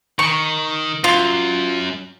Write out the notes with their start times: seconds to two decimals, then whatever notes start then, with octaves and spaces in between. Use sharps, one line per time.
0.19 D#3 C#6
1.04 F#2 F4